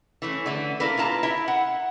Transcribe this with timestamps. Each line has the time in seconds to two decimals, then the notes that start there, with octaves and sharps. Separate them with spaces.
0.22 E3 A3 C#4
0.46 D3 A3
0.80 A#3 D4 E4 A#4 B4
0.97 A#3 F4 A5 A#5
1.23 E4 E5
1.48 F#5